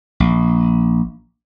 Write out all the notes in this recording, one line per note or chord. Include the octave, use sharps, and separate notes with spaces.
A#1